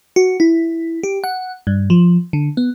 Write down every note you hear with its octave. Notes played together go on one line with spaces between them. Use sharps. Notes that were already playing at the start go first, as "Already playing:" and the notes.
F#4
E4
G4
F#5
G2
F3
D3
B3